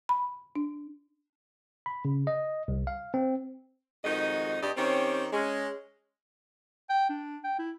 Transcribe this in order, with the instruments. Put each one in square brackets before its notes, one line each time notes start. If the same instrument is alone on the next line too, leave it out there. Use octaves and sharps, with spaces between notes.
[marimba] B5
D4
[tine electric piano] B5
C#3
D#5
C2
F5
C4
[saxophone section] F2 D#3 G#3 D#4 F#4 D#5
G2 G4 D5 D#5
D#3 C4 C#4 G4 C5 C#5
G#3 C#4
[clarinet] G5
D4
G5
E4